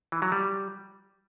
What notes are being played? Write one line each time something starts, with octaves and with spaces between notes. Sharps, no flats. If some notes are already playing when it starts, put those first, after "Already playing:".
E3
F#3
G3